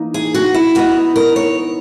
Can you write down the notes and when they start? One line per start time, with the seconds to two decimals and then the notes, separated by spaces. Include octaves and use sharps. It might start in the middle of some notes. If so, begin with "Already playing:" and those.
Already playing: E3 A#3 D#4
0.14 G#4
0.34 F#4
0.54 E4
0.75 E3 B3 D#4 F#4
1.16 A#4
1.36 C#5